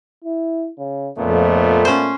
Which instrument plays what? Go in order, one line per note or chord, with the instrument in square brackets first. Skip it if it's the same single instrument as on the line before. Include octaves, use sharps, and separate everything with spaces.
[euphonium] E4
C#3
[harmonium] F2 [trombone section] A#2 A3 B3 [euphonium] C#3
[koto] C#4 C5